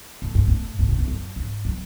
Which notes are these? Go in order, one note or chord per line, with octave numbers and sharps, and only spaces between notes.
A2
G#2
A2
A2
B2
A2
F#2
G#2
F#3